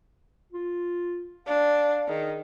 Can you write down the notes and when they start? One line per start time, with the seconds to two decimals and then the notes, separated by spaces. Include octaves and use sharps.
0.53 F4
1.47 D4 F5
2.08 D#3 G#4